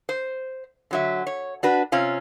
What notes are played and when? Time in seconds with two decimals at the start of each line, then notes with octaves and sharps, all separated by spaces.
0.09 C5
0.91 D3 F#3 E5
1.27 C#5
1.63 D4 F#4 B4
1.92 C3 C4 C#4 F4